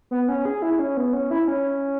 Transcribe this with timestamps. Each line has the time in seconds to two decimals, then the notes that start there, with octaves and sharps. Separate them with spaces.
0.11 B3
0.28 C#4
0.45 G#4
0.62 E4
0.79 C#4
0.97 B3
1.13 C#4
1.31 E4
1.48 C#4